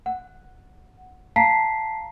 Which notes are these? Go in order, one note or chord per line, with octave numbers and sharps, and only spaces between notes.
F#5
F5 A5 A#5 B6 C7